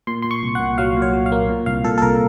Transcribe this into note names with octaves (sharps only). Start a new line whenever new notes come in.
A#2 C6
A#2 C6
C#6
C2
F#5
A#2
F#3 F5
A#2
C#5
F#3
F5
A#3
A#2
C2 F5
A#2 A4
A4
C2 A#4